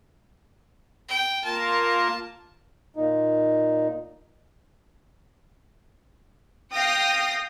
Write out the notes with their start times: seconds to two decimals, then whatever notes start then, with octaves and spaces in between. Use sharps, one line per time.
1.08 G5
1.45 A#3 F4 A#4 A5
2.96 A#2 D#4
6.73 F5 G5 D#6 A#6